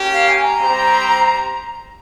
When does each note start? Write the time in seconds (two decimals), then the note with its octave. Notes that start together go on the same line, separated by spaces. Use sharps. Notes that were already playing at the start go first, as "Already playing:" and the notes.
Already playing: A#3 C#4 G4
0.13 F5
0.28 G#5
0.44 A#5
0.59 G3 C4 G4 C5